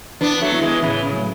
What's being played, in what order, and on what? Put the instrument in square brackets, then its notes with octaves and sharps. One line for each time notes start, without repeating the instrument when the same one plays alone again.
[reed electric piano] E3 [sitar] B3 D4
[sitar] F#3 A3
[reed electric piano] B3 E4
[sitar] E3 G#3
[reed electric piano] A2 [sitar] C#3 E3
[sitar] C#3
[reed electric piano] F#3 A3